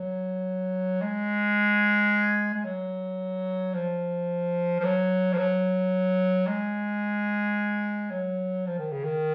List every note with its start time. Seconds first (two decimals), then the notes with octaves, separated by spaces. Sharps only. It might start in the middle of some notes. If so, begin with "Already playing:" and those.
Already playing: F#3
1.02 G#3
2.54 G#3
2.65 F#3
3.74 F3
4.80 F3
4.84 F#3
5.33 F3
5.38 F#3
6.47 G#3
8.11 F#3
8.66 F3
8.78 D#3
8.92 C#3
9.04 D#3